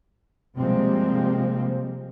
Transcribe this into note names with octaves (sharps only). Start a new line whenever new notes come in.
C3 F3 G3 G#3 A#3 C4